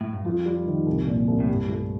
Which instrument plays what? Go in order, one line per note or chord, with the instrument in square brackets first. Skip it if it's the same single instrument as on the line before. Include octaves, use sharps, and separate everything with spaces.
[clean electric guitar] A2
G2
[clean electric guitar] F2 [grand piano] F4
[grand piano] G3
D#3
C2
A#2
C2
[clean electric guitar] A2
[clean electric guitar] G2 [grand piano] G4
[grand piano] A3